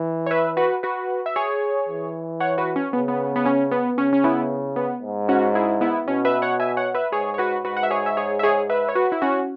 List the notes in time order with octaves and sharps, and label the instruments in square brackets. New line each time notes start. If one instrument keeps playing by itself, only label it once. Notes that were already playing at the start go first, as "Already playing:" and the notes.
Already playing: [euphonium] E3
[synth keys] C#5
B4 E5
F#4 B4
F#4 B4
E5
G#4 C#5
[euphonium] E3
[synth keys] C#5 F#5
F#4 B4
C#4
[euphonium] C#3 [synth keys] B3
[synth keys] B3
B3
C#4
B3
[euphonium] C#3 [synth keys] C#4
[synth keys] C#4
B3 E4
B3
[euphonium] G#2
[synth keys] C#4 F#4
E4 G#4
B3 E4
[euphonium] B2 [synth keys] C#4
[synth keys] B4 E5
C#5 F#5
E5 G#5
C#5 F#5
B4 E5
[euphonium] G#2 [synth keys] G#4 C#5
[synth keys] C#5
F#4 B4
[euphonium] G#2 [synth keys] F#4 B4
[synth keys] F#5
E5
G#4 C#5
E5
G#4 C#5
E5
G#4 C#5
B4 E5
C#5
F#4 B4
E4
C#4 F#4